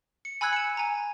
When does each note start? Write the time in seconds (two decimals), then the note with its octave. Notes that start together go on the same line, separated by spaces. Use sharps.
0.25 C#7
0.41 G#5 B5 E6 F#6 G#6
0.53 C#7 E7
0.77 G#5 A#5